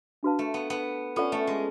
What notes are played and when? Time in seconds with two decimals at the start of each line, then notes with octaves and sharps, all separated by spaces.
0.23 D4 F#4 B4 F5 A5
0.39 A3
0.54 B3
0.70 B3
1.16 C#4 F4 A4 D5 F#5
1.32 A3
1.47 G#3